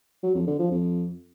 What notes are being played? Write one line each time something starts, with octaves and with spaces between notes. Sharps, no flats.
F#3
F2
D3
F3
F2